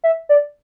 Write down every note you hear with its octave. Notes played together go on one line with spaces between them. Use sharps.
E5
D5